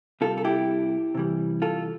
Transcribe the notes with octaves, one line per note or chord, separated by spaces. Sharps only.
C3 G3 F4 A4
A4
E4 G4
C3 E3 G3
F4 A4